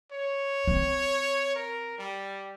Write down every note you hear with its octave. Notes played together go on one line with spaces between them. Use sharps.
C#5
C4
A#4
G3